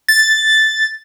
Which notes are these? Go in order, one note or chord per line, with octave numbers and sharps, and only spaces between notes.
A6